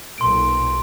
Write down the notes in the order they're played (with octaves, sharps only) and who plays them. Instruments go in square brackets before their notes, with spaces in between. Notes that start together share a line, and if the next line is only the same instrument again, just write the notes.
[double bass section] B1 A#2 [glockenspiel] C6 D7